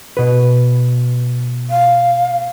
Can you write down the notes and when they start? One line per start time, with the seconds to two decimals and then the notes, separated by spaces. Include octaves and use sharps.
0.17 B2 B4
1.70 F5